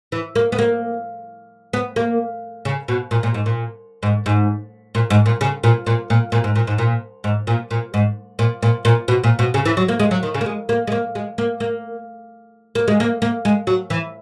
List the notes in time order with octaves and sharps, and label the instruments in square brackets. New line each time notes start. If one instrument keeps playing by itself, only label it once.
[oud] E3
A#3
B3
A#3
B3
A#3
C#3
B2
A#2
A#2
G#2
A#2
G#2
G#2
A#2
G#2
A#2
C#3
A#2
A#2
A#2
A#2
G#2
A#2
G#2
A#2
G#2
A#2
A#2
G#2
A#2
A#2
A#2
B2
A#2
B2
C#3
E3
F#3
A#3
G#3
F#3
D#3
C#3
A#3
G#3
A#3
G#3
A#3
G#3
A#3
A#3
A#3
G#3
A#3
A#3
G#3
F#3
E3